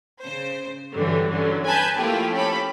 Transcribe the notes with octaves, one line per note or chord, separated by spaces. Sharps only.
C#3 C5
G2 D3 E3 F#3 G3
D3 F#3 C#4
B4 G#5 A5 B5 G6 G#6
F3 A3 A#3 E4 F4 G4
C#4 G4 A4 B5